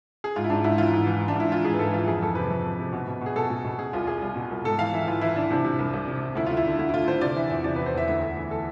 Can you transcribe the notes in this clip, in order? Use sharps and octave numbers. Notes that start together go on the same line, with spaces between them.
G#4
G#2 F4
E4
G#2 D4
G#2 E4
E3 F4
G#2
E3
E3
D4
G#2 E4
E3 F4
G#2 G#4
B4
G#2 A4
E3 F4
F2 G#4
F2 A4
C3 B4
F2
F2
C3
B2
B2
B2 G#4
B2 A4
B2
B2
B2 G#4
C2 F4
C2 G#4
C2
B2
C2
G#2 A4
E3 F5
E3 E5
E3 F4
E3 E4
E3 D4
C3 D4
C3
C2
C2
C3
C3
D2 E4
D2 F4
E4
D3
D2 E4
E4
D3 F4
D3 C5
C3 D5
E3 E5
E2 E5
C3 D5
E3 B4
C5
E2 E5
D2 E5
D2
E3
A4